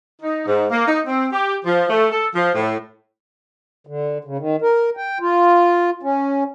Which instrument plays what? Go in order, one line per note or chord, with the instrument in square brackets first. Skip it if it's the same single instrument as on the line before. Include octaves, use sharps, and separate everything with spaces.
[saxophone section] D#4
G#2
A#3
D#4
C4
G4
F3
A3
A4
F3
A2
[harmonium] D3
C#3
D#3
A#4
G5
F4
C#4